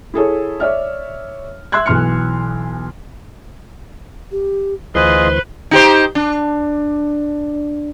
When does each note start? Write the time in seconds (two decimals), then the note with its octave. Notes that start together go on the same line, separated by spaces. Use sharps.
0.14 E4 G#4 A4 C#5
0.60 C#5 D5 E5 F6
1.72 E5 C6 E6 F#6 G#6
1.86 B1 E3 C6 F6 C#7
4.32 G4
4.95 D2 E3 F4 G#4 B4 C5 D#5 C6
5.71 D#4 G4 C5
6.15 D4